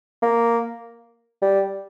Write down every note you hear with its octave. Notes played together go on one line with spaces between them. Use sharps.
A#3
G3